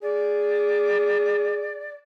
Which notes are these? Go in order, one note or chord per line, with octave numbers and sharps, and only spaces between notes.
G#4 D5